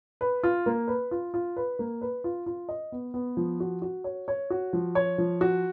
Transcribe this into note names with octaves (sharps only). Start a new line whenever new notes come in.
B4
F4
A#3
B4
F4
F4
B4
A#3
B4
F4
F4
D#5
B3
B3
F3
F#4
F#4
C#5
C#5
F#4
F3
C#5
F3
F#4